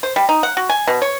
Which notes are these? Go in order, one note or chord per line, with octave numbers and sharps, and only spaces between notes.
C5
G3
D#4
F#5
F#4
G#5
B2
C#5